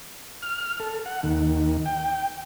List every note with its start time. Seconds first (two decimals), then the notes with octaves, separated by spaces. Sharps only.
0.42 F6
0.80 A4
1.06 F#5
1.23 D#2
1.86 G5